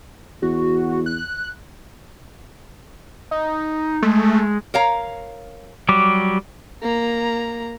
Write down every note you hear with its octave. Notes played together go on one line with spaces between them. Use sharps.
E2 F#4
F#6
D#4
G#3 A3
A#4 C#5 F5 A#5
F#3 G3 G4 D6
A#3 A#5